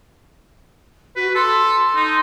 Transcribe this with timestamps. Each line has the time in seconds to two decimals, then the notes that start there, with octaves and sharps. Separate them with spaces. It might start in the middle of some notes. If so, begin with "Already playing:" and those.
1.16 F#4 B4
1.35 A4 C6
1.96 D#4